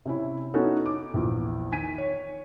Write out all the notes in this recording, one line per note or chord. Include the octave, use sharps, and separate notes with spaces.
C3 C#4 E4
B3 C#4 D#4 E4 F#4 A4
D6
A#1 E2
D#3 G#5 B6 D#7
C#5